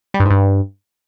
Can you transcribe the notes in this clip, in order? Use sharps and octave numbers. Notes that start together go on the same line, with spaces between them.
G3
G2
G#2
G2